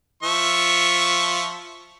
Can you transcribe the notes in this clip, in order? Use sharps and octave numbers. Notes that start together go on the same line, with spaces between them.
F3 E5 C#6